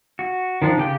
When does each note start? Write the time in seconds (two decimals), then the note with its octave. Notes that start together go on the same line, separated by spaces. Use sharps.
0.19 F#4
0.62 D#3 F3 D4
0.78 C#3 G4 G5